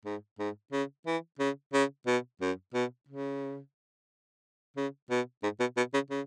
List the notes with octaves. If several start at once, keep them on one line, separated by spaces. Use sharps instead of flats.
G#2
G#2
C#3
E3
C#3
C#3
B2
F#2
B2
C#3
C#3
B2
G#2
B2
B2
C#3
C#3